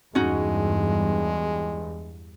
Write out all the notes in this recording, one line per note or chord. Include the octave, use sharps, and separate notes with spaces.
E2 G2 G#3 C#4 D#4 F#4